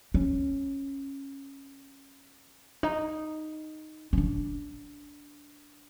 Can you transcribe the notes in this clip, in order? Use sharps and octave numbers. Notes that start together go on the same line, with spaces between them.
C#4
D#4
C#4
D4